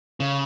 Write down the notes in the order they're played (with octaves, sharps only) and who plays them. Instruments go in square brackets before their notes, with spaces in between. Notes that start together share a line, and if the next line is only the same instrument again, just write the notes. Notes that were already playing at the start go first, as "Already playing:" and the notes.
[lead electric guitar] C#3